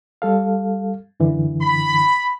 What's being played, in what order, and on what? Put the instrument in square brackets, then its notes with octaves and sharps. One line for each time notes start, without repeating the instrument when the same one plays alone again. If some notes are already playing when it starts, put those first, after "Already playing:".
[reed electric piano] G3 A4 F5
F#2 D3 E3
[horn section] B5